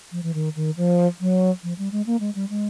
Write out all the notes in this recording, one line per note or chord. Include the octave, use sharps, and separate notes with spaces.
F3
E3
D#3
D#3
F3
F#3
F3
G3
G#3
A#3
G#3
G3
G#3